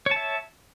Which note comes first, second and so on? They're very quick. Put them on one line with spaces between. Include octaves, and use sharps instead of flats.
C#5 A5 E5